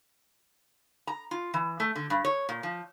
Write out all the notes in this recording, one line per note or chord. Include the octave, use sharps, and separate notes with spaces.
A#5
F4
E3
A3
D3
G2
C#5
A#2
F3